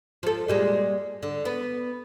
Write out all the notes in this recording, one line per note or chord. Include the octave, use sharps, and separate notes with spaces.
F3 A4
A#2 G3 G#3
D3
B3